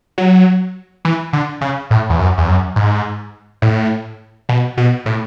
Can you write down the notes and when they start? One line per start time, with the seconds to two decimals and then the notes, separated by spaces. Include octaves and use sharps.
0.18 F#3
1.05 E3
1.33 D3
1.61 C#3
1.90 A2
2.10 E2
2.20 F#2
2.38 E2
2.48 F#2
2.76 G#2
3.62 A2
4.49 B2
4.77 B2
5.06 A2